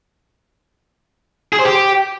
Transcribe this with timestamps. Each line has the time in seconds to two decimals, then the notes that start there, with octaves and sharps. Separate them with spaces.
1.53 G#4
1.59 C5
1.65 G4